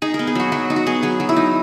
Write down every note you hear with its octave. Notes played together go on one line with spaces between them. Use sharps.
D#4 G#4
A#4
B3
G#4
F#3 F#4
F#3 F#4
D#4
F#4
B3 G#4
F#3 G#4
F#3
E4
D#4